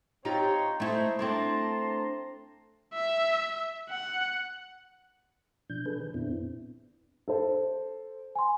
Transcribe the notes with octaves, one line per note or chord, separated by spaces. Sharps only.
C4 D#4 F4 G4 C#5
A3 D#4 E4 A4 C5
A3 C4 D4 E4 A5 A#5 C6
E5
F#5
B2 F3 D4 G6
D4 G#4 A4 B4
D#3
F2 A#2 B3 C4 D4 E4
A4 C5
G#5 C6